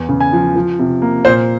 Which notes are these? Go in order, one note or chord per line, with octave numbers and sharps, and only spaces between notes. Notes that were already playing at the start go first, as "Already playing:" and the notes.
Already playing: E2
C#3
G#5
F3
F3
C3
A#3
A#2 C5